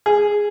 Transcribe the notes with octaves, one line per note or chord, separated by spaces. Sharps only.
G#4